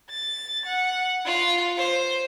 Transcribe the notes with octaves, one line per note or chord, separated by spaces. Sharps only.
A6
F#5
F4
C5